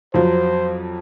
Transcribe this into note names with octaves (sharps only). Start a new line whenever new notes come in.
F2 F3 F#3 C5